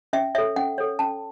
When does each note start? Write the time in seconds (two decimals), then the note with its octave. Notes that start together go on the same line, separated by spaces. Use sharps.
0.13 C#4 E5
0.35 A4 C#5 E5
0.56 C#4 F#5
0.78 A4 C#5
0.99 C#4 A5